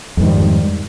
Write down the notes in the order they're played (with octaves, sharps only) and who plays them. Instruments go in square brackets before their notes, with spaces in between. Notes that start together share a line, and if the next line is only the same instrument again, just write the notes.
[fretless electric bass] F2
G#2
D#3
G3